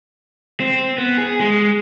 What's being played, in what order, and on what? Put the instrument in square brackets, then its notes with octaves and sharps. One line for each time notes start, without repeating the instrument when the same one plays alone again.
[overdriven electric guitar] C4
B3
G#4
G#3